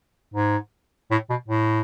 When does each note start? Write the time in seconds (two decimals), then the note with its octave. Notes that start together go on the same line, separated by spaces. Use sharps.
0.34 G#2
1.11 A2
1.30 B2
1.48 A2